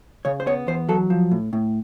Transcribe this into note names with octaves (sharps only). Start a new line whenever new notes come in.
C#3 C#5
C5
B3 C#5
E2 C5
F#3 A4
F3
A2
A2